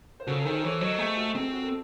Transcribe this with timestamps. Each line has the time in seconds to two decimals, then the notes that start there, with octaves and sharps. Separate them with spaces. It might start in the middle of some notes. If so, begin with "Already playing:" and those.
0.20 C5
0.27 C#3 F#4 A4
0.41 A4
0.45 D#3 G#4 C5
0.63 E3 A4 C#5
0.81 F#3 C5 D#5
0.98 A3 G#4
1.17 F#4
1.35 C4 G#4
1.53 F#4
1.63 A4